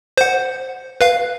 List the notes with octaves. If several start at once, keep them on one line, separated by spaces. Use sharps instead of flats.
C5 F#5
B4 F5